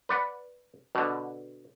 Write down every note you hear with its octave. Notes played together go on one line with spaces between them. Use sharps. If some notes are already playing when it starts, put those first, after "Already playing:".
B4 D5 F#5
B2 D3